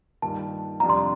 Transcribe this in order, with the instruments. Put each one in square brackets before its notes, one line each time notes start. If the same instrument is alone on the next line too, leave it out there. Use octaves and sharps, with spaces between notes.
[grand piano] G2 D#3 A#3 F4 [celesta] A5
[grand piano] F2 C3 G3 D4 F4 [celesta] A#5
[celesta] C6